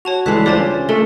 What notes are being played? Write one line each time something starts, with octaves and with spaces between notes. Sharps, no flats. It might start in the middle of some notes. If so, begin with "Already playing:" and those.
F#4 C#5 A5 F7
C#2 E3 G3 G#3 A4 D5 F#6 B6
D4 F4 G4 C5 C#5 A5
C#4
A3 A#4